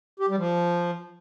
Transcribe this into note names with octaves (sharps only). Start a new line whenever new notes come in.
G4
G3
F3